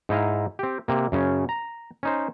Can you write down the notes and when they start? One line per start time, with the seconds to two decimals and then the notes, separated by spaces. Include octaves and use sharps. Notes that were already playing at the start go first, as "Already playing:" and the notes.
0.09 G#2 D#4 E4 D#5 F5
0.59 C4 G4
0.88 C3 A#3
1.12 F#2 C#3 C#4
1.49 A#5
2.03 C#4 D#4 C5